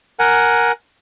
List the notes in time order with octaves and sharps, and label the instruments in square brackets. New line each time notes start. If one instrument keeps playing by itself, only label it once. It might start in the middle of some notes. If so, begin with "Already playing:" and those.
[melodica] A#4 F#5 G#5